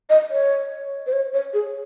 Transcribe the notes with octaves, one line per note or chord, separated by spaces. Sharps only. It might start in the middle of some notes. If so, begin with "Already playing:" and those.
D#5
C#5
C5
C#5
C#5
G#4